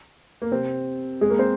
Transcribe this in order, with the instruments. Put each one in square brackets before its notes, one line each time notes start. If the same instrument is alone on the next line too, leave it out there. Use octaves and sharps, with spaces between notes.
[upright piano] A#3
C3 C4
G#3 G#4
A#3 A#4
C4 C5